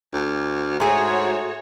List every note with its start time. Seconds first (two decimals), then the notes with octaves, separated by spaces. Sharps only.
0.13 D2
0.80 G#2 A3 F#4 G#4 C#5